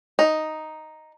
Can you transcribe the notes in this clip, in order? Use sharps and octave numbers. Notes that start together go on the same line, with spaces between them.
D#4